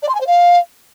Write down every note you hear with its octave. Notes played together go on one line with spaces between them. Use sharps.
D5
C6
G#5
C5
F5